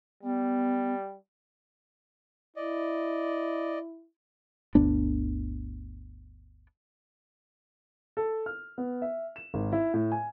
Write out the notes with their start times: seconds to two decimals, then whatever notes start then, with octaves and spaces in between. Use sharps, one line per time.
0.23 G3 B3
2.56 E4 D5 D#5
4.75 G1 D2 B3 D4
8.17 A4
8.46 F6
8.78 B3
9.02 E5
9.36 E7
9.54 G#1
9.72 E4
9.94 A2
10.12 G#5